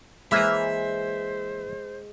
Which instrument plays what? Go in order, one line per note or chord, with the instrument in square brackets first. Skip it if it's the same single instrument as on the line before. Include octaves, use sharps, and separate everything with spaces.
[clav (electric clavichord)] E3 A#3 B4 [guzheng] G#3 A#5 [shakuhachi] C5 [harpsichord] E5